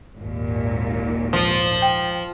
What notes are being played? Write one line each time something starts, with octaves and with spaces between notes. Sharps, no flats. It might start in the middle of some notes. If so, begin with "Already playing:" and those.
G#1 D#2 A#2
F3
G5